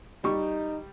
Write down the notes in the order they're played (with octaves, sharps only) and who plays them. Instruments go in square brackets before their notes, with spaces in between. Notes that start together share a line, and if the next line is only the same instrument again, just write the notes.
[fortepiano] G3 C#6 [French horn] D#4